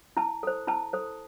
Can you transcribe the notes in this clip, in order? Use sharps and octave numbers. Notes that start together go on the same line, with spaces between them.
E4 A5
A4 C5
E4 A5
A4 C5